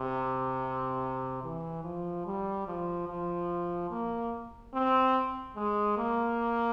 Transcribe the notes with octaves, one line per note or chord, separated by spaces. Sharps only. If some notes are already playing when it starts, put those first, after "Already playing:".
Already playing: C3
E3
F3
G3
F3
F3
A#3
C4
G#3
A#3